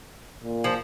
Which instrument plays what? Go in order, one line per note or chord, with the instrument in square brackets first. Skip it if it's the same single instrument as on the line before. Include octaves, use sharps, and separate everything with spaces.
[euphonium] A#2
[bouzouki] F3